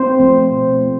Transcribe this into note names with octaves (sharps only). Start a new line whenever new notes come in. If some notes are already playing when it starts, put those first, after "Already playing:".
Already playing: C4 C5
F3 A3
B2
A3